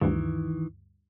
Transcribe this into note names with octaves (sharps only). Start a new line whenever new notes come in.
D2 G2 D#3 E3